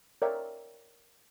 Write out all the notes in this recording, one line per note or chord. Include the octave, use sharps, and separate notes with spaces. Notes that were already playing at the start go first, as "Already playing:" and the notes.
A#4 C#5 D5 E5 G5